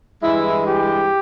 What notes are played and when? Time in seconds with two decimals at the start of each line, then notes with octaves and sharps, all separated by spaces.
0.23 G2 E3 G#3 E4
0.68 G4